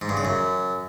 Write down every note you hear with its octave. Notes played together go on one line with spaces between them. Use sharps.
G#2
G2
C#3
F#2